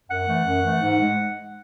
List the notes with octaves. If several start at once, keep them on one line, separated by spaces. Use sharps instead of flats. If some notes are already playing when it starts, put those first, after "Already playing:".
F#2 F#5
E3 A3
F#2
E3 A3
G#2
G#3